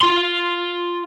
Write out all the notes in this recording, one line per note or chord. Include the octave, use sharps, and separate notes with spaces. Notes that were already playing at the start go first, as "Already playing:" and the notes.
F4 C6